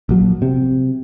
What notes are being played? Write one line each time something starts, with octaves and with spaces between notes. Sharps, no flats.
A#1 F#3
C3